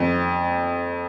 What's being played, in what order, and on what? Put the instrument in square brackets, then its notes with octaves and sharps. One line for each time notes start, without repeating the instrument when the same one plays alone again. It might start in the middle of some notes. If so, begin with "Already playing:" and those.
Already playing: [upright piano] F2